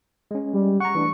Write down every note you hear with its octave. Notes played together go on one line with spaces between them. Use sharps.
G#3 C#4
G3
F#5 A#5 C#6
E3 A3 D4